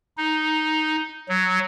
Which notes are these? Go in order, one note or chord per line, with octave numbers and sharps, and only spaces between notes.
D#4
F#3